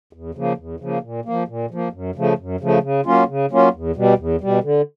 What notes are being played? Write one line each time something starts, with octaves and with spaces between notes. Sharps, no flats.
E2
C#3 F3 A#3
E2
C#3 F3 A#3
A#2
F3 A#3
A#2
F3 A#3
F#2
C#3 F3 A3
F#2
C#3 F3 A3
C#3
F#3 A#3 C#4 F4
C#3
F#3 A#3 C#4 F4
E2
B2 G3
E2
B2 G3
D3